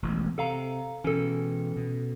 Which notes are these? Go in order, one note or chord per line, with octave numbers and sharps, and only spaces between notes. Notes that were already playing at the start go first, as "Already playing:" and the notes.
E1 A1 F2
C3 A4 F5 A#5
B2 E3 C#4 A4
B2